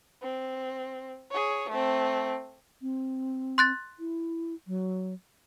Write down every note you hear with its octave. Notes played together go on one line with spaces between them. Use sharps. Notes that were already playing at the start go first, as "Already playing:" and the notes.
C4
G#4 C#5
A3 C4
C4
C6 F#6 A6
E4
F#3